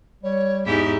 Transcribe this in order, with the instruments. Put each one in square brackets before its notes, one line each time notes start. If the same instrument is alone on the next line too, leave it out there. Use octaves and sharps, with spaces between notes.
[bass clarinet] G3 [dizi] C#5
[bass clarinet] E2 [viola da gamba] G#2 E4 G4 [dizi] D#4